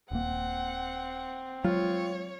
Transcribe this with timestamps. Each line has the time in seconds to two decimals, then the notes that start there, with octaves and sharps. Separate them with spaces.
0.11 D#1 A#3 C4 F#5
1.64 F#3 G#3 F4 C#5